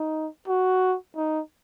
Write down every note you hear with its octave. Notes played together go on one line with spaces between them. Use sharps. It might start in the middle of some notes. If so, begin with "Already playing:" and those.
Already playing: D#4
F#4
D#4